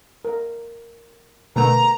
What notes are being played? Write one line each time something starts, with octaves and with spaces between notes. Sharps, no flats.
A#4
B2 D3 A3 A#4 B4 F#5 A#5